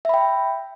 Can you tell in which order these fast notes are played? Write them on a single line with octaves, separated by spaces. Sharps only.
E5 B5 G5